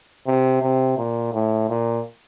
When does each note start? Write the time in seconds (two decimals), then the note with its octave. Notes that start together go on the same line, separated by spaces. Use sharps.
0.27 C3
0.62 C3
0.98 A#2
1.33 A2
1.69 A#2